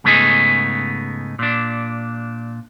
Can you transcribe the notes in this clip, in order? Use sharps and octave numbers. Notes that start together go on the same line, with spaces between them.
G#2 C#3 A3 B3 D#4 G#4
A#2 D4